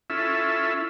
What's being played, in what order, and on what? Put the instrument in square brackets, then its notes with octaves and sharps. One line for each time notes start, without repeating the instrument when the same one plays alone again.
[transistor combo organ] C#4 E4 F4 A4 E5